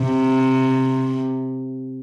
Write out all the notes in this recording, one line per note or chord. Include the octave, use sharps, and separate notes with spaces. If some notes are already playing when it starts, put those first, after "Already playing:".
Already playing: C3